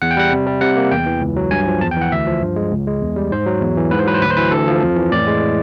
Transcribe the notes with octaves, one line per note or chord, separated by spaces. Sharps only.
E2 F#5
G5
G3 F#5
C3
G3
C3 F#5
A#3
E2 G5
E3
C#2
F#3
G2 G#5
F3
E2 A5
G5
E3 F#5
D2 E5
F3
G2
G#3
C#2
G#3
E2
G3
G#2 C5
F#3
E2
E3
G#2 B4
C5
F#3 B4
C5
D2 B4
C5
E3 B4
D2 A4
F3
F2
E3
A2 D5
G#3